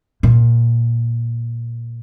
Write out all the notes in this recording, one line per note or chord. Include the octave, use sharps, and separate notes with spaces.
A#2